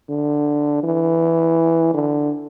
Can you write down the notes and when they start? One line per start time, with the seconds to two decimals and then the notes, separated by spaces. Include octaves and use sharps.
0.09 D3
0.83 E3
1.94 D3